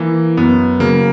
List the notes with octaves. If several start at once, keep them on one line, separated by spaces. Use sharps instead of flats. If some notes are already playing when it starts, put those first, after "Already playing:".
Already playing: E3 A#3
F#2 B3
C#3 F#3 A#3